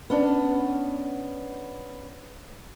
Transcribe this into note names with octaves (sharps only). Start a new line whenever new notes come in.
B3 C#4 D4